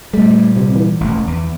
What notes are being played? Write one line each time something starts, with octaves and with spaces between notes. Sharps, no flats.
A#2 G3 A3
C3
E3
E1 A1
E2